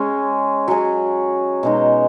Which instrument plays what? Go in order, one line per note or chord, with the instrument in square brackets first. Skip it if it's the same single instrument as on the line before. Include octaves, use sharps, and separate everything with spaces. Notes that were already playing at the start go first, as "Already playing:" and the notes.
Already playing: [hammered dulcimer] G#3 C#4 G#4
F#3 C#4 G#4
B2 G#3 D#4